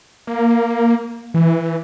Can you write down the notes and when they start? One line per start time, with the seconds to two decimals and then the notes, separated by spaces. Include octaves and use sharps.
0.27 A#3
1.34 E3